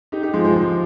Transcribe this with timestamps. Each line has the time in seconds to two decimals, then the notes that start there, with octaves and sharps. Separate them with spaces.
0.12 D#4 G4
0.23 D#4 G4
0.33 F3 G#3
0.44 F3 G#3
0.56 F3 G#3